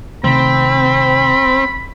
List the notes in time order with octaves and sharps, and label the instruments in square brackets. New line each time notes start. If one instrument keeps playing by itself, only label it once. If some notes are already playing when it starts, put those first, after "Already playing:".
[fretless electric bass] C3 D#3 A3 [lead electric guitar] C4 [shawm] B5